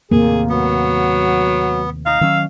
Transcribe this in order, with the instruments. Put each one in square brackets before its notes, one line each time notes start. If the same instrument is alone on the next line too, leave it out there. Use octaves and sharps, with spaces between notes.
[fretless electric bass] D#2 A2 C3 [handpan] A#3 [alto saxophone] G#4
[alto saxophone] F#3 [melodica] B3
[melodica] D#4 [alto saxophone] F5
[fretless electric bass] D#3 F#3 C#4 [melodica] E6